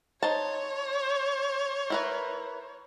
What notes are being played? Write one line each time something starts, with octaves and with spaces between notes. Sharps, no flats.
D#4 C5 C#5 A5
E4 A#4 B4